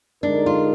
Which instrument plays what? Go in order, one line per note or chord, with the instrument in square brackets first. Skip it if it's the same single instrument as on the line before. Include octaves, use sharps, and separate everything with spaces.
[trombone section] D3 G#3 D#4 A#4 [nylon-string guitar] D4
[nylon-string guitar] F4